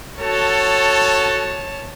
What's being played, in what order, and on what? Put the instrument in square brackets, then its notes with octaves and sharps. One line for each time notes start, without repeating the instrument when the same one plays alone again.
[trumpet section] F#4 A4 [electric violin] C#5 A5